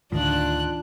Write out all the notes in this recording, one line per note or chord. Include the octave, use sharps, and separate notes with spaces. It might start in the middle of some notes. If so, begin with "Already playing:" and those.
D2 A2 D#3 D4 F4 F#6